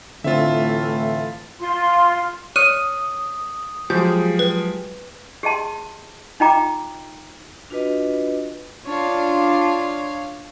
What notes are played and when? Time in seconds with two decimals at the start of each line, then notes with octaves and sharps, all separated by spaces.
0.24 A2 D3 E3 A3 C4 F4 E5
1.60 F4 C6
2.56 C#5 D#6 F6 F#6 D#7
3.90 F3 F#3 G#3 G4 G#4 G6
4.39 B4
5.43 G4 G#4 D#5 A5 C6
6.40 D#4 F4 D#5 G5 A#5 D6
7.70 D4 F4 F#4 B4 D#5
8.86 D4 F4 C#5 F5